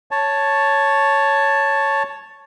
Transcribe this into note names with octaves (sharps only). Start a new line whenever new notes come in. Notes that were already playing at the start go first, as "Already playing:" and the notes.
C#5 A5